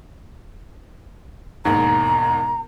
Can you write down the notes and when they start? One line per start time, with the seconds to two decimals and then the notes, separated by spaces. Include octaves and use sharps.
1.65 E1 D#2 G#2 A#5